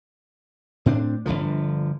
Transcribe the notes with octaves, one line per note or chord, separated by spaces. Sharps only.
A2 C4 D4
G1 C#2 D3 F3